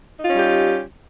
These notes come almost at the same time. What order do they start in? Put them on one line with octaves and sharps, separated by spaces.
D#4 F4 C#4 G3 G4